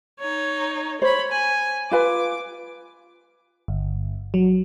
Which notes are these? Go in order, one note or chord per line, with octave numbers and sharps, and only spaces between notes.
D#4 C#5
C5 C#5 B5
G#5
F4 B4 G#5 D6
G1
F#3